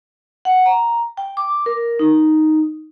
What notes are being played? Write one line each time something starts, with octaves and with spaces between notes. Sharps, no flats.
F#5
A#5
G5
D6
A#4
D#4